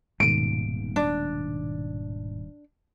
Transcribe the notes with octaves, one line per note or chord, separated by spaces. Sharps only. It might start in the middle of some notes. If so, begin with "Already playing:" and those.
D#1 G#2 B2 D#3 D7 D#7
D4